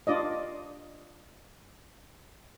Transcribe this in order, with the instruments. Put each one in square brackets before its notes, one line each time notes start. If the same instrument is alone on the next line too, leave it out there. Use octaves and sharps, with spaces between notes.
[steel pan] D4 F4 D5 D#5